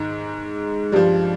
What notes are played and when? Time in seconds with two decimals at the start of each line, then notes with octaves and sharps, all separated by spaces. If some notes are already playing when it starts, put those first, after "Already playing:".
Already playing: G#2 D#3 G#3
0.92 G2 F3 G3